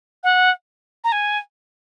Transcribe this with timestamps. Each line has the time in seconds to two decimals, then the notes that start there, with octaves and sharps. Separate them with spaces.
0.24 F#5
1.04 A#5
1.12 G#5